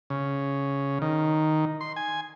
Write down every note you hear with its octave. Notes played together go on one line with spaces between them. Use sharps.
C#3
D#3
C6
G#5